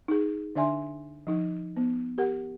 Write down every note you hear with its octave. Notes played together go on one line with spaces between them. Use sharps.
D#4 G#4
D3 D4 D5 E5 G#5 C6
F3 D#4
B3
G4 A#4 F#5